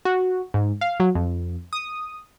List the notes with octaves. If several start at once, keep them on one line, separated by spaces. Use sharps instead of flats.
F#4
G#2
F5
F#3
F2
D#6